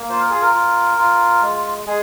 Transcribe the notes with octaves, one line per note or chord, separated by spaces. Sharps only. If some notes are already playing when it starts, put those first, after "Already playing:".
Already playing: A#3
F4 C5
A#4
G#4
A#4
F4
F4
G#3
G#3 G#4